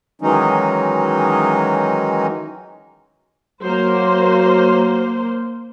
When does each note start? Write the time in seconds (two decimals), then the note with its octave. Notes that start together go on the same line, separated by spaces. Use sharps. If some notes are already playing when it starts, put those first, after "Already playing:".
0.21 D#3 E3 F#3 G#3 C#4 D#4
3.62 F#3 A#3 C5